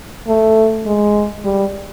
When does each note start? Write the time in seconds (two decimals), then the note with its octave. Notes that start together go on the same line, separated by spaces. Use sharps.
0.28 A3
0.86 G#3
1.45 G3